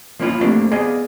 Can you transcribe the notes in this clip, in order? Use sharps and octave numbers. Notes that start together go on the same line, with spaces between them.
F3 A#3 C#4 E4 F4
A3 A#3 C4 D4 G4
B3 G#4 D5 D#5 F5